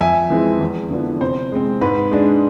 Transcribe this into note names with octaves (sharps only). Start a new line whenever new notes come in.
F2 E5 G#5
E3 G#3 C4
E2
D3 F3 B3 D4
C3 C5
G#3 C4
G#2 B4
G#3 D4